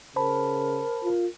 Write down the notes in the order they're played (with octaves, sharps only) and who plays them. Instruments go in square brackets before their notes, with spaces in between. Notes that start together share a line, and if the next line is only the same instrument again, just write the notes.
[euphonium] C#3 [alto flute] A#4 [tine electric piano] C5 A5 B5
[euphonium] F4